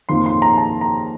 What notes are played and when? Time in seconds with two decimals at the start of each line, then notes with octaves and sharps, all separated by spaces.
0.09 F2 D#3 A#3 C6
0.26 C6
0.42 A#5
0.57 A5
0.81 A#5